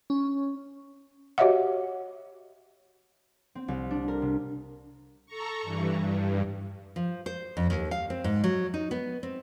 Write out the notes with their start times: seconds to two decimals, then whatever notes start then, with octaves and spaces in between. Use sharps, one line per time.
0.10 C#4
1.38 F#4 G4 C#5 D#5 E5 F#5
3.55 C4
3.68 C2
3.91 D4
4.08 A#4
4.22 C3
5.26 A4 A#5 C#6
5.62 G2 E3
5.99 G2
6.96 F3
7.26 C5
7.57 F2
7.70 D#2
7.91 F5
8.10 C4
8.24 G#2
8.44 F#3
8.74 D#4
8.91 B3
9.23 C4